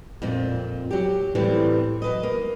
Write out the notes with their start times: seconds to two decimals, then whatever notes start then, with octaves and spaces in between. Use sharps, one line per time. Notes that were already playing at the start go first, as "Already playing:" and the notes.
0.22 F2 A#2 C4
0.91 F#3 G4
1.35 A2 E3 G3 C4
2.02 F#3 B4 D#5
2.23 A#3